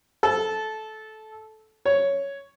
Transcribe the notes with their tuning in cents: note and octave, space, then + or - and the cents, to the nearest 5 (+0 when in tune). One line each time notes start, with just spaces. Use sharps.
A4 -15
C#5 +5